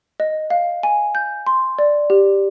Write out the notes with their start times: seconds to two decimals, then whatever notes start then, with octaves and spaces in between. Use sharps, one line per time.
0.20 D#5
0.50 F5
0.83 G#5
1.15 G6
1.47 C6
1.79 D5
2.10 G4